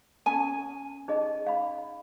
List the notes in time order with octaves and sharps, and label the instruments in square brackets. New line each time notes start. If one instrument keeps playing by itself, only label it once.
[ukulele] C#4 G#5 [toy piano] A5
[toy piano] D#4 G#4 D#5
F5 B5